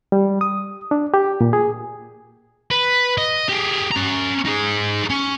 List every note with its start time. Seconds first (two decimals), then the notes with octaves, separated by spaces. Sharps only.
0.12 G3
0.41 D#6
0.91 D4
1.14 G4
1.41 A#2
1.53 G#4
2.71 B4
3.18 D#5
3.49 G4 G#4
3.91 C#4 A#5
4.45 D#4 G#4
5.10 C#4